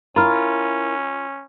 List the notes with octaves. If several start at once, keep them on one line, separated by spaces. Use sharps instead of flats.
C#4 E4 F4 A#4 A#5 B5 F6